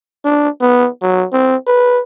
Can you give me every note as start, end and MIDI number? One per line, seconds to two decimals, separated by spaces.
0.25 0.49 62
0.60 0.88 59
1.01 1.26 54
1.33 1.56 60
1.67 2.01 71